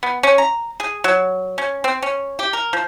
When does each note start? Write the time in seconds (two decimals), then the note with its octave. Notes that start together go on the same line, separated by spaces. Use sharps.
0.03 B3
0.23 C#4
0.38 A#5
0.80 G#4
1.04 F#3
1.58 C#4
1.84 C4
2.02 C#4
2.39 G4
2.53 A#4
2.73 F3